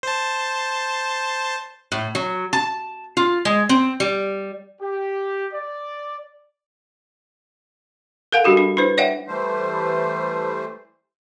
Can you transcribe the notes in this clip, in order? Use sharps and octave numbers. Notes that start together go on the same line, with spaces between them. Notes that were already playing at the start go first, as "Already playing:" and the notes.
C5 A5
A2
F#3
A5
F4
G#3
C4
G3
G4
D5
A4 A#4 F5 F#5 G#5
G3 D4 F#4 G4
D4
D4 E4 B4 C5
C#5 D5 E5 F#5 G5
E3 G3 A3 C5